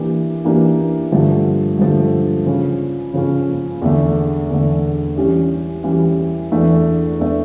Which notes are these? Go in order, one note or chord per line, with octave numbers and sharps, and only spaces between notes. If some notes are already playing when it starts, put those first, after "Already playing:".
Already playing: E3 A#3 D4 G4
E3 A#3 D4 G4
G2 D3 F3 A3
G2 D3 F3 A3
C#3 F3 C#4
C#3 F3 C#4
E2 D3 A3
E2 D3 A3
E3 G3 C#4 G4
E3 G3 C#4 G4
E2 E3 A3 D4
E2 E3 A3 D4